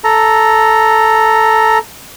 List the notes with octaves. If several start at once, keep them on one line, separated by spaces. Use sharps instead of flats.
A4 A#5